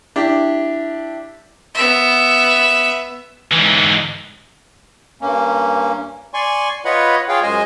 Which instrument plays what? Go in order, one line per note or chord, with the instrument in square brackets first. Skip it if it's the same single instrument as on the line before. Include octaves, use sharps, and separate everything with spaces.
[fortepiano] D4 E4 G4
[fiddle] B3 E5
[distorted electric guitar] G#2 E3
[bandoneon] G2 A#3 C#4
D5 G#5 C6 C#6
F4 B4 C#5 D#5 F#5 B5
F4 G#4 C#5 F5 G5
F#2 G#3 C5 D#5 G#5